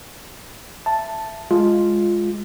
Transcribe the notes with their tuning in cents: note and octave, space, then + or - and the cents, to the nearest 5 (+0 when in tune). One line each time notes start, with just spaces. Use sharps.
E5 +15 A5 +0
G#3 +0 F4 +0